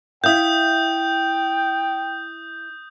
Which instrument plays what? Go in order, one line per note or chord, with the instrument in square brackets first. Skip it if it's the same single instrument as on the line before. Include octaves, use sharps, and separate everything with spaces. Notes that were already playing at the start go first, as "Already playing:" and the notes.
[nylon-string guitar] E4 E5 F5 [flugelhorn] G5 [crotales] D#6 G6